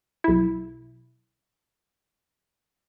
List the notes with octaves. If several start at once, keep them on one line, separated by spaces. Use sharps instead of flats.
B1 E4